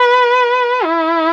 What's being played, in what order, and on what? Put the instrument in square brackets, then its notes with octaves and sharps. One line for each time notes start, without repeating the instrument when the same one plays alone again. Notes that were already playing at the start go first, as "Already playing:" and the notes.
Already playing: [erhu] B4
E4